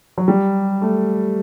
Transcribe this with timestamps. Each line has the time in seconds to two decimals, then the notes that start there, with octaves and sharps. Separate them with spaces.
0.18 F#3
0.28 G3
0.82 A3